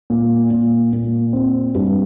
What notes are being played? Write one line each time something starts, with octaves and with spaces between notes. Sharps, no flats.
A#2
A#2
A#2
C4
G2